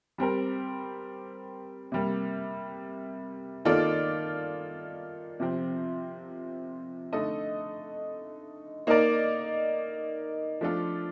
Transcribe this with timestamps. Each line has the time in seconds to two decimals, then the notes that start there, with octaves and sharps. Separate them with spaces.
0.18 G3 C4 G4 A#4
1.92 C3 G3 A#3
3.65 D#3 A#3 F4 A4 D5
5.40 C3 F3 C4
7.12 D3 A3 D#4 A4 D#5
8.87 A#3 D#4 A#4 D5
10.61 F3 A3 D4 F4 A4